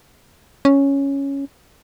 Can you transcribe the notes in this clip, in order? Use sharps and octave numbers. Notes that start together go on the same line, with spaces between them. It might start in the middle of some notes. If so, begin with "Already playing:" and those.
C#4